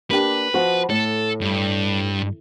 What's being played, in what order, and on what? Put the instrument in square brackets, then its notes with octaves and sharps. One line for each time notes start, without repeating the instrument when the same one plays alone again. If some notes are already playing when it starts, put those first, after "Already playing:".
[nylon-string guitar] A#3 D4 G4 [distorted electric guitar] B4
[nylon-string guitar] F3 B3 F#4
[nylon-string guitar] A2 [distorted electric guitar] A4
[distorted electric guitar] G2